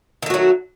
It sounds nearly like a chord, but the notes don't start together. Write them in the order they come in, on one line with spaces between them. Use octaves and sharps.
D#3 A3 F#4 F#3